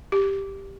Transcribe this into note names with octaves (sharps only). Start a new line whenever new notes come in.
G4